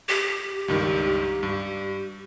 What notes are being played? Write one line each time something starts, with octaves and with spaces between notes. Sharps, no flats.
G4
C#2 G2 D#3
G2